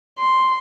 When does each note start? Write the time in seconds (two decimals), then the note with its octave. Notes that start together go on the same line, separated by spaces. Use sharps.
0.18 C6